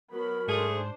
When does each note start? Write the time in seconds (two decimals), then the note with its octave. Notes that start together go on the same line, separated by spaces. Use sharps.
0.11 F#3 B3 A#4 B5
0.48 G#2 A3 D4 G#4 C5